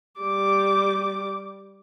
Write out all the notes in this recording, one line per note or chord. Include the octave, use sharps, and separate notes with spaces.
G3 D6